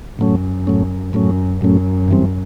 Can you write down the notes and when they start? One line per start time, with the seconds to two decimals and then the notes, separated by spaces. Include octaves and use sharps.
0.19 F#2 A2 F#3 A3 C#4
0.67 A2 F#3 A3 C#4
1.13 F#2 A2 F#3 A3 C#4
1.60 F#2 A2 F#3 A3 C#4
2.08 G2 E3 G3 C4